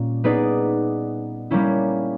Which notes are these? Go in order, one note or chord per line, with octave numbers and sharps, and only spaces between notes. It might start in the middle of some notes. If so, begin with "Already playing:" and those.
Already playing: A#2 G3 A#3 C#4
B3 D#4 G#4 B4 D5
G3 A#3 C#4 E4